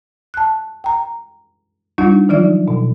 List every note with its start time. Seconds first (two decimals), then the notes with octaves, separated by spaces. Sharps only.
0.34 A5 F#6
0.84 G5 A#5
1.98 G3 D4 D#4 F4
2.29 D#3 F3 F#3 D#4 F4 D5
2.68 B2